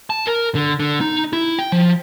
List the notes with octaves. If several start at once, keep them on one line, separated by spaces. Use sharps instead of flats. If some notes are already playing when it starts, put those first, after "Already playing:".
A5
A#4
D3
D3
D#4
E4
G5
F3